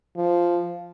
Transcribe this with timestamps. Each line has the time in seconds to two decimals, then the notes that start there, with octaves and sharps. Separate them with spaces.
0.16 F3